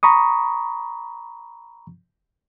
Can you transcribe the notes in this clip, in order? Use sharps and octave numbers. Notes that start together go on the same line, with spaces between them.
A#5 B5 C#6 D#6